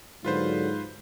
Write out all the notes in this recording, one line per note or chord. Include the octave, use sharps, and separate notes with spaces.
G#2 D3 F#3 F4 B4 C5